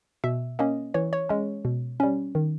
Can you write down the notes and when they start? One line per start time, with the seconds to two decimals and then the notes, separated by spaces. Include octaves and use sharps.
0.24 B2 E5
0.59 A#3 C#4 D#5
0.94 E3 C#5
1.13 C#5
1.29 G#3 C#4
1.65 B2
2.00 G3 C#4
2.35 D#3